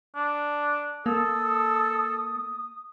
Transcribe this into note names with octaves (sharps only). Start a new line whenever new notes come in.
D4
A#3 A4 D#6